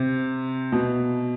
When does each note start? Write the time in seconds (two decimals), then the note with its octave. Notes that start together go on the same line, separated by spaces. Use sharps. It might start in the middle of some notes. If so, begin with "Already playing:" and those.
Already playing: C3
0.72 B2